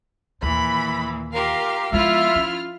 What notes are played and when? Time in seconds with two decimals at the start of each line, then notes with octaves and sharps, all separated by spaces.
0.42 D#2 A#2 E3 B5
1.33 F4 G4 A#4 F5
1.92 F3 G#3 B3 E4 F4 E5 F6
2.36 C#4